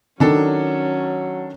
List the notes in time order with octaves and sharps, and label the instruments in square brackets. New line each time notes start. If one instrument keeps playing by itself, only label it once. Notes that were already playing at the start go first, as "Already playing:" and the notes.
[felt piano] D#3 [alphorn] F#3 [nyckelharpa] C#4 [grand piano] D4 A4